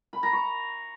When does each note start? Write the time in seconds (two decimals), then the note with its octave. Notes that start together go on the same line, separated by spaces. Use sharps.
0.13 B5
0.23 A#5
0.33 C#6